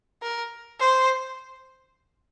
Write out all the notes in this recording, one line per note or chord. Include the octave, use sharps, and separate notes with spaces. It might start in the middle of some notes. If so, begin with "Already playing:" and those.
A#4
C5